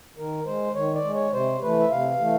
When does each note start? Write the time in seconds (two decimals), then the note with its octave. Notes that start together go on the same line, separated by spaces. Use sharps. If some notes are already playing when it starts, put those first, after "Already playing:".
0.17 D#3 A#4
0.45 G#3 C5
0.75 D#3 C#5
0.94 D5
1.04 G#3
1.14 C#5
1.33 C3 C5
1.62 E3 A3 B4
1.79 E5
1.91 C3 F5
2.20 E3 A3